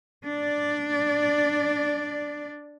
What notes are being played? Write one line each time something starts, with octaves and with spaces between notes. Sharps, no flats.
D4 D5